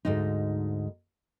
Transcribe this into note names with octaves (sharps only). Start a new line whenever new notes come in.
D2 G#2 D#4